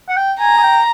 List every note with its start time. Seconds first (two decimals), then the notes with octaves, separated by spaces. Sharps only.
0.09 F#5
0.16 G5
0.40 G#5 A#5
0.58 G#5
0.63 G5